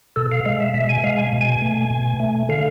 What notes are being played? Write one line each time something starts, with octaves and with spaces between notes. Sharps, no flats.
B2 A4
F5
G#3 F5
E5
B2 E5
G#5
G#3 F5
G#5
B2
G#5
A3
B2
A3
D3 F5